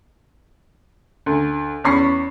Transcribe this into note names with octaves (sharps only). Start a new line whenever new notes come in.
D2
E2 C#4 B5 C#6 C7